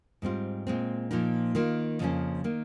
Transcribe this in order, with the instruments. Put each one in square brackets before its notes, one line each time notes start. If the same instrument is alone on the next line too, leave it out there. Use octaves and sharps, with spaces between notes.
[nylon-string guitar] G#2 G3 C4 F4
A#2 G#3 C4
A#2 F3 A#3 D#4
D#3 A#3 F4
F2 C#3 F3 A#3 C#4
D#3 A#3